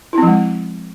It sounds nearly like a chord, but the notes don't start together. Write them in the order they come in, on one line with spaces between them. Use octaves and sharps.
E4 C4 F3 G#3